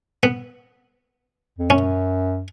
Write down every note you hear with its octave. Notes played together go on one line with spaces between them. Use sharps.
B3
F2
F#2 C#4